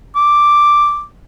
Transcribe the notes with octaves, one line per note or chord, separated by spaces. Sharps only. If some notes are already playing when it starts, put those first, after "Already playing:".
D6